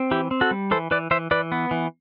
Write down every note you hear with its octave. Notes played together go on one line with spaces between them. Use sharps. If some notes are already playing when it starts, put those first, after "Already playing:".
Already playing: C4
E3 E4 G4
C4
F#4 A4
G3
E3 A4 C5
E3 B4 D5
E3 C5 E5
E3 B4 D5
B3
E3